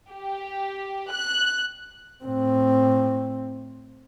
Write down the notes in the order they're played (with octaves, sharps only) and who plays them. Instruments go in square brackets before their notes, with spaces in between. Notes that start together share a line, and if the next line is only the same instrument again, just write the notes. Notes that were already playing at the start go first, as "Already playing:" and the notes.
[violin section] G4
F#6
[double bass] A2 C4